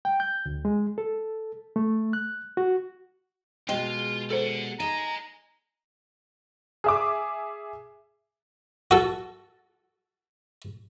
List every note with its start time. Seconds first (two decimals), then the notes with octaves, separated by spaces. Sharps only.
0.05 G5
0.20 G6
0.46 D2
0.65 G#3
0.98 A4
1.76 A3
2.13 F#6
2.57 F#4
3.69 B2 G#3 F4 G4 D#5 G5 C6
4.31 A4 C5 D5 F#5
4.80 D#4 D#5 G#5 A#5
6.84 G#4 E5 D6
8.91 F#4 A4